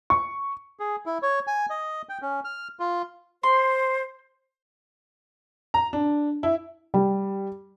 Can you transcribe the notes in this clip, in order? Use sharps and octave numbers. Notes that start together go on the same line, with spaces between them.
C#6
G#4
E4
C#5
G#5
D#5
G5
C#4
F6
F4
C5 C6
A#5
D4
E4
G3